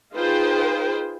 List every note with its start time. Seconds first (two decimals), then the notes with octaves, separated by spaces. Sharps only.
0.14 D#4 F4 G#4 B4 C5 G5